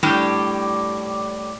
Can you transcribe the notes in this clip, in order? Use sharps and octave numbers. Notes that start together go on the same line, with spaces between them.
A2 G3 D4 G4